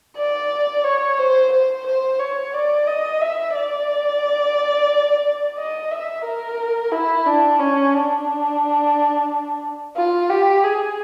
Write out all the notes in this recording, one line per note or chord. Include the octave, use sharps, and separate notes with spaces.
D5
C#5
C5
C5
C5
C#5
D5
D#5
E5
D5
D#5
E5
A#4
E4
D4
C#4
D4
F4
G4
G#4